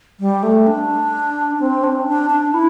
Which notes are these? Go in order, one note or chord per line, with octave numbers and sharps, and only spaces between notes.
G3
A3
D4
C4
D4
D4
D4
E4